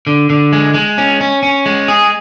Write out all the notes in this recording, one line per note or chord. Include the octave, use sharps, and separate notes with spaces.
D3
D3
G#3
G#3
C#4
C#4
C#4
G#3
G#4